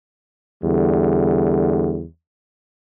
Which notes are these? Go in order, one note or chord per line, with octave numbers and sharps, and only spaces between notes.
E2 D3 G3